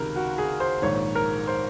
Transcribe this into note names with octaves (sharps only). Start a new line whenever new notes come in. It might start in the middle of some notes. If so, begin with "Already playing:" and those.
Already playing: C#2 C3 D#3 A#4
F#4
G#4
C5
A#1 G#2 D#3 C#5
A#4
C5